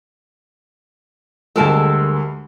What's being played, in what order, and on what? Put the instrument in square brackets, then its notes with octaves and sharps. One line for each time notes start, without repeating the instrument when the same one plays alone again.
[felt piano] D2 G3 G#3 [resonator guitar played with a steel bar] A4 A#4 A5